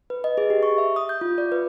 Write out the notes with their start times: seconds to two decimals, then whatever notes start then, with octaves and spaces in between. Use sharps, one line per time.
0.10 B4
0.24 D#5
0.38 G#4
0.50 G4
0.63 C#6
0.78 E5
0.96 D#6
1.09 G6
1.21 F4
1.38 D5
1.52 B4